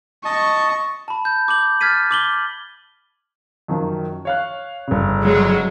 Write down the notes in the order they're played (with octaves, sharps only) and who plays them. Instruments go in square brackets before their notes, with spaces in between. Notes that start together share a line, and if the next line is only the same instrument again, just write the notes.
[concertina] D#5 A5 [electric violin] C#6
[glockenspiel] A5 B5
G6
D6 G6 F#7
F6 G#6 A6 B6 D#7
D6 F#7 G7
[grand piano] F#2 D#3 F3
C#5 F5 F#6
G1 C#3
[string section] F#3 G#3